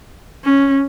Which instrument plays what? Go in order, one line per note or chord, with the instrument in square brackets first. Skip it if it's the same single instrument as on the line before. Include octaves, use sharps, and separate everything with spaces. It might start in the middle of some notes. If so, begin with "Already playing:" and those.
[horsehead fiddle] C#4